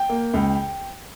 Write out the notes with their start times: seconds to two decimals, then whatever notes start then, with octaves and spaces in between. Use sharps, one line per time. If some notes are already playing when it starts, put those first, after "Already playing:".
Already playing: G5
0.09 A#3
0.34 C#2